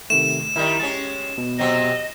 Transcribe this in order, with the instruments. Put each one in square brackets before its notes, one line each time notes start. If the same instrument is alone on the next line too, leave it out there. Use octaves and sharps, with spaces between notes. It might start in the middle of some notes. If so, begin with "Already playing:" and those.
[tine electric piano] C3 D#3 A3 [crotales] E7
[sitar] D#3 G3 [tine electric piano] E4 A#4
[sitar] G#3 C#4 [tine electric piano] A6
[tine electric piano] B2
[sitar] C3 F#3 C4 [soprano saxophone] D#5